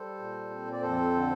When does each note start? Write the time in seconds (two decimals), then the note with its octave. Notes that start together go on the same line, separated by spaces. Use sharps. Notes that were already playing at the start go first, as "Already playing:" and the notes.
Already playing: G3 A4 C5
0.18 A#2
0.50 C4
0.72 D5
0.81 F2 A4 C5
1.14 D3